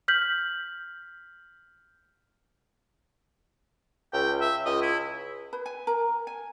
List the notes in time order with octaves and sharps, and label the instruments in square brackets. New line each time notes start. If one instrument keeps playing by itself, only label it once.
[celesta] F6 G6 B6 F#7
[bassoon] C#2 [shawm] G5
[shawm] E5
[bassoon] C#2 [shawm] D#5
[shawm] E4
[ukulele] B4
G#5
A#4
G#5